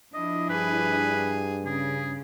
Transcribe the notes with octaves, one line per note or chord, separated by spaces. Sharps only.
F3 D4 E4 D#5
G2 G#4 B4
C#3 G#4